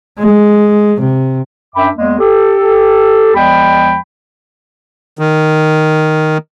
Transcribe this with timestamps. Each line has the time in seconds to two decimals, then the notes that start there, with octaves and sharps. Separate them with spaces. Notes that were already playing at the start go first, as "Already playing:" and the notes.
0.19 G#3
1.00 C3
1.75 F#2 D4 E5 G5 B5 D6
1.96 E2 G#3 A#3
2.19 G4 A4
3.35 E2 F3 G#3 G5 B5
5.19 D#3